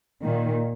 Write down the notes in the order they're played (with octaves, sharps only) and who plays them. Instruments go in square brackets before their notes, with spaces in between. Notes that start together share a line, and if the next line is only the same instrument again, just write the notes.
[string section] A#2 D#3